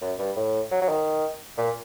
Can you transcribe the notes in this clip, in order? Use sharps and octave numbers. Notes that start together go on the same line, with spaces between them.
F#2
G2
A2
F#3
F#3
D#3
A#2